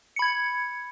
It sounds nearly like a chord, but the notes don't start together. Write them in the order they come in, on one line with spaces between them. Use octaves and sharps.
C#7 B5 G#6